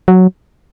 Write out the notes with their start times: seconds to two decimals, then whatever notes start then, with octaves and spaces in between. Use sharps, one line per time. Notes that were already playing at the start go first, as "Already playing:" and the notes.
0.08 F#3